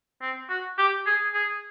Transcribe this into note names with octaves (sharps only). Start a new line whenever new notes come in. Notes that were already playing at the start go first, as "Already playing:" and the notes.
C4
F#4
G4
G#4
G#4